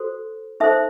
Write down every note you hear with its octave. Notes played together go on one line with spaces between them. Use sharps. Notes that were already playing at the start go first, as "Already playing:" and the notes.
Already playing: F#4 A4 C5
D#4 A4 C5 E5